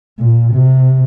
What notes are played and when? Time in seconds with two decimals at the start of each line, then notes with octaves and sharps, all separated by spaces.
0.20 A#2
0.53 C3